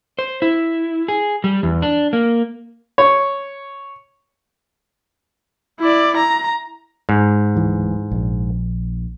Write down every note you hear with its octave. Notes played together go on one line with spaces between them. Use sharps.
C5
E4
G#4
G3
E2
D4
A#3
C#5
E4 D5
A#5
G#2
D1 E3 G#3
A#1